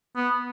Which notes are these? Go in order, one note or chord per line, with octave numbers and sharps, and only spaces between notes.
B3